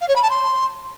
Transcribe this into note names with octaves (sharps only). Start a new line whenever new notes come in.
F5
C#5
B5
A5
C6